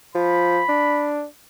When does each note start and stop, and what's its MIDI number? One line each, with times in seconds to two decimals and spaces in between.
0.15 0.61 53
0.15 1.12 83
0.69 1.25 62